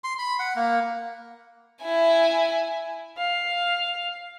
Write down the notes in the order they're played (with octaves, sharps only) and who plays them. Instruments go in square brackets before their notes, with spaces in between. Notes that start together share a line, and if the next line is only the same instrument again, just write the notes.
[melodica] C6
B5
F#5
A#3
[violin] E4 G#5
[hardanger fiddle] F5